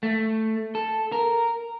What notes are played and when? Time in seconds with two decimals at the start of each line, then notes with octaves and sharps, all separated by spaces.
0.03 A3
0.75 A4
1.12 A#4